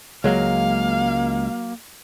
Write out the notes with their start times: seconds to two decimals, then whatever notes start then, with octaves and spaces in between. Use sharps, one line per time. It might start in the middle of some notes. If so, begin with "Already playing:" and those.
0.24 C#2 F#3 G#3 A#3 F5